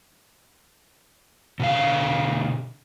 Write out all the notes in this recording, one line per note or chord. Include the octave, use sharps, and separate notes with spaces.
B2 D3 F5